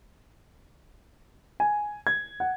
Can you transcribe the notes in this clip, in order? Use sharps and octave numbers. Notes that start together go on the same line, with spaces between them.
G#5
G#6
F#5